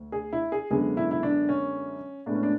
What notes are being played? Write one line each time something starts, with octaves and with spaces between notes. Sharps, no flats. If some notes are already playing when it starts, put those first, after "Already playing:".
Already playing: D2
G#4
E4
G#4
F#2 D3 G#3 B3 G#4
E4
E4
D4
C#4
A2 G#3 B3 D4
C#4
D4